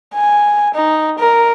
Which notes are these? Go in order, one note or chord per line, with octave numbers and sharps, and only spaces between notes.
G#5
D#4
A#4